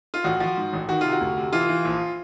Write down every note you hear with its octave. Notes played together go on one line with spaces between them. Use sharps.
F4
A1 F#4
F3
G#2
A1
D#3 F#4
C3 F4
F#4
D2
C3
E3 F4
E3
A#1